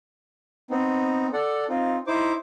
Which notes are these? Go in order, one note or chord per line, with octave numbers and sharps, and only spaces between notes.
B3 C4 D#4
A4 D5 F#5
C4 D#4 F4
D#4 E4 C5 D6